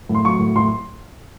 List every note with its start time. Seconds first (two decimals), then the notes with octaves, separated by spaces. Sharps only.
0.09 A2
0.15 C6
0.25 F#3 C#6
0.40 A2
0.56 A2 C6